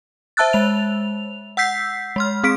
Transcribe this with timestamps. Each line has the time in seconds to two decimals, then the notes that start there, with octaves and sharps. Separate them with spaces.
0.37 C5 E5 A5 E6 F#6 A6
0.53 G#3 F7
1.57 F#5 E6 G6 B6 C7
2.16 G#3 C6 F6
2.44 C4 G#4 F6 B6 D7